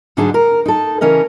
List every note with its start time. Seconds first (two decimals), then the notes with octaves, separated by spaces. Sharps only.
0.17 G#2 D3 F#3 D4 D#4 G#4
0.34 A#4
0.66 D#4 A4
1.01 C#3 E3 C#4 A#4 D#5